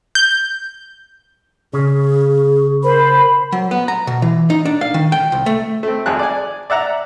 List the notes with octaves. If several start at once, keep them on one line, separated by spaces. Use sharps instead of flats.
G6
C#3 G#4
A#4 C5 B5
F#3
B3
A#5
B2
E3
D#4
D4
F5
D#3
G5
C2
A3
A3 C4
G#1 F2 G#4 A5 F#6
D5 G#5
D5 E5 F#5 A#5